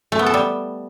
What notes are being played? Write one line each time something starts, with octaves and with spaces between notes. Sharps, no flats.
A3
B3
A4
G3